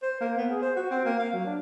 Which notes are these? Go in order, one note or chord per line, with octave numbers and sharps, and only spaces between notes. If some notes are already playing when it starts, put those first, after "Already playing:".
C5
A#3
B3
G#4
C5
F#4
C4
A#3
F5
F#3
D4